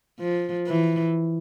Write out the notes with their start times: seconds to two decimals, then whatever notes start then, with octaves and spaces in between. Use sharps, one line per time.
0.19 F3
0.67 E3